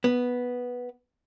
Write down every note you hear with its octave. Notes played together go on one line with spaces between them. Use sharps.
B3